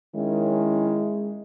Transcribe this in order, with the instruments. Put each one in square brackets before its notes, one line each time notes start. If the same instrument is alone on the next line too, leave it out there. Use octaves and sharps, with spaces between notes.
[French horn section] D#3 C#4 E4 [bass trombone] G#3